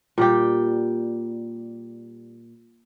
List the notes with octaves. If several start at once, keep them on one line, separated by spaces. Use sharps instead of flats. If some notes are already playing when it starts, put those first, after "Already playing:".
A#2 G3 G4